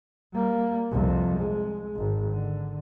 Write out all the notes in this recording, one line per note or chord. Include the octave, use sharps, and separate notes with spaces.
G3 A#3
C2 F2
G#3
G#1
D3